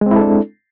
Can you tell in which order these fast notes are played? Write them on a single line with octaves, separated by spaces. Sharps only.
G#3 C4 E4 A4 D4